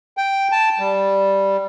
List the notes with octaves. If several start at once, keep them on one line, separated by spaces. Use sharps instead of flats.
G5
A5
G3